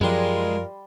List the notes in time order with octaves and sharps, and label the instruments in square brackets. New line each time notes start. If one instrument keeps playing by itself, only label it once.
[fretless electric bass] F#2 F3 [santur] G3 B5 C6 [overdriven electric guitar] G#3 [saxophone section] F4 A#4